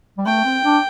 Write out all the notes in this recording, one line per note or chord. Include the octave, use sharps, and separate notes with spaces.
G3
A3 G5
C4
D4